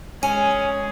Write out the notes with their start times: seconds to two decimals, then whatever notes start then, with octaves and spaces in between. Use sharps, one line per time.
0.23 G#3 C#4 G#4 G#5